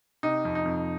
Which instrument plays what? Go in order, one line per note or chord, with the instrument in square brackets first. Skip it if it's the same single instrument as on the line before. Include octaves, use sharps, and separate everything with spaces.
[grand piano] C3 D#4
F2
D#4
F2